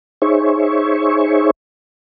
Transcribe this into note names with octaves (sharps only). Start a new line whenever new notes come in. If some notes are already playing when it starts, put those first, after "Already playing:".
D#4 G#4 C5 C#5 E5 C#6